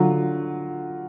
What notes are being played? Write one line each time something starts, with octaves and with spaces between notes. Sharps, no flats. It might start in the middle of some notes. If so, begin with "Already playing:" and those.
Already playing: D3 F#3 F4